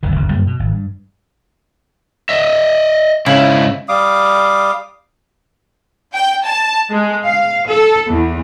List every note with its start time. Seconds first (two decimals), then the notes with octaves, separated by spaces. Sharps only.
0.03 D1 G1 F2 D#3
0.15 F#1 D2 G2
0.31 F#2 G3 A#3
0.47 B2
0.59 G#1
0.72 G2
2.29 D#5 E5
3.26 G#2 C#3 E4
3.89 G3 F5 D6 D#6
6.13 G5
6.44 A5
6.92 G#3
7.26 F5
7.68 A4
8.08 E2